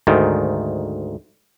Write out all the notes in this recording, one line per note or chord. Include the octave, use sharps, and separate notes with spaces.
D2 G#2 D#3